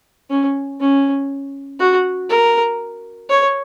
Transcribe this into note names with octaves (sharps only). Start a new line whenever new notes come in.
C#4
C#4
F#4
A#4
C#5